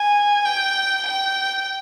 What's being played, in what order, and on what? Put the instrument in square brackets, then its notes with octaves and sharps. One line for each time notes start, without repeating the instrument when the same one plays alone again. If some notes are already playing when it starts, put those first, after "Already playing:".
Already playing: [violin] G#5
G5
G5